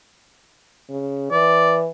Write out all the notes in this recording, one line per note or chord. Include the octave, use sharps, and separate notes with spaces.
C#3
E3 D5